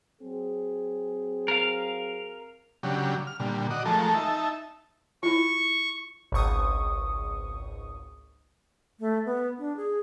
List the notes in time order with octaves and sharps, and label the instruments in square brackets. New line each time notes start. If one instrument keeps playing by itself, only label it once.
[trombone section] F#3 C4 G#4
[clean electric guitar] A#4 F5
[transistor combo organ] C#3 F#3 D4 G4
F6
A#2 D3 G3
F#4 D5 D#5
F3 G#3 A3 A4 A#4
D#4 E5 A5
[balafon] E4 F4 [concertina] C#6
[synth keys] G#1 C#2 C#6 D#6
[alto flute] A3
B3
D4
G#4